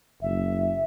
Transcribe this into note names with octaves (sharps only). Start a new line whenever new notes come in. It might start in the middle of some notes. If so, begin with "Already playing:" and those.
F#1 E5